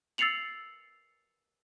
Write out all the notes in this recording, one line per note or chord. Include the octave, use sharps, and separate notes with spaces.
E6 A6 C7 C#7 F7 F#7